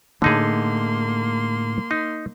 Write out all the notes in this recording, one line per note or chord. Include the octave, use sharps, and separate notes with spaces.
A2 D3 A3 A#3 D#4 G#4 C6
D#4